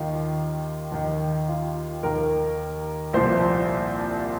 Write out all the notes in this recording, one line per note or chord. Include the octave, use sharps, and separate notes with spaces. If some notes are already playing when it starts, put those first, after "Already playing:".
Already playing: D#2 D#3 F4
D#2 D#3
F4
D#2 D#3 A#4
C2 A#2 F3 C5